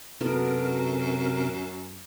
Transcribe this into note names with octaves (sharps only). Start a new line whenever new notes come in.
F#2 C3 B3 F#4 A4 A#4